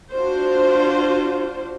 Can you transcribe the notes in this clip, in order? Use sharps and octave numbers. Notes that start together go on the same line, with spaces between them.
D4 F4 F#4 C5